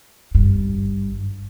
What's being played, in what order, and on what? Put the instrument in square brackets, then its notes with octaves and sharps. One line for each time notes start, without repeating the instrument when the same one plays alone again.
[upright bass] G#1 G2